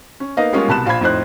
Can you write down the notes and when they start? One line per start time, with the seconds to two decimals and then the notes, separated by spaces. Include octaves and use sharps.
0.20 C#4
0.37 A#3 B3 D#4 D#5 F5
0.53 G3 G#3 A#3 B3 C#4 F4
0.68 C2 B2 A5 B5 F#6 E7
0.86 A#1 F4 C5 F5 B5 G#6
1.01 F2 A2 D#4 C5 C6 F#6